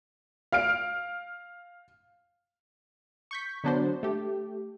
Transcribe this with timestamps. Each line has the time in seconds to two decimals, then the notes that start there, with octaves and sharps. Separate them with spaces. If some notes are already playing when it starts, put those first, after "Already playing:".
0.52 F5 F6 D7
3.31 C#6 G6 B6
3.64 D3 F#3 B3 D4 F#4 C5
4.03 A3 G4